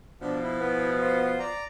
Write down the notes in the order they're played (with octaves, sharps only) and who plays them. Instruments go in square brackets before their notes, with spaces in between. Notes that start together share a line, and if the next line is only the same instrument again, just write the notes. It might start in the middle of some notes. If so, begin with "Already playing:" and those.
[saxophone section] B2 F3 [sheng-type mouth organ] D4
[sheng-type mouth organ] E4
[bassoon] B3
[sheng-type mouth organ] F4 C5
D5 A#5